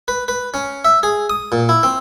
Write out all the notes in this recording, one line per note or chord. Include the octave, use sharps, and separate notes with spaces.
B4
B4
C#4
E5
G#4
D#6
A#2
E4
C4